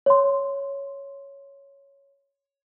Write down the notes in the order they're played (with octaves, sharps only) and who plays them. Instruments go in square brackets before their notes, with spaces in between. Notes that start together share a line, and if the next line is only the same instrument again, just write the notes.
[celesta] C#5 C6